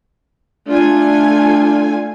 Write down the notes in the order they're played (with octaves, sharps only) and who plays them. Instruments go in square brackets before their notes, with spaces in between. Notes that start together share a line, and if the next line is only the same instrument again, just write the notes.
[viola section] A3 F4 G#5 [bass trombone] D4